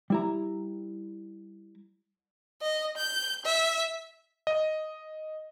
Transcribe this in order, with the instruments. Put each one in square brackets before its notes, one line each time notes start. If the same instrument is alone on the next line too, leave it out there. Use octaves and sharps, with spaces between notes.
[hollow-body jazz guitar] G3 E4 A#5
[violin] D#5
G6
E5
[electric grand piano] D#5